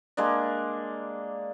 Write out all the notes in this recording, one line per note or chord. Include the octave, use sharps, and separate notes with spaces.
G#3 A#3 D4